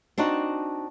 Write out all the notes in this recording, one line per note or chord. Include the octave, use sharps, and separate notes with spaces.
C4 D4 D#4 F#4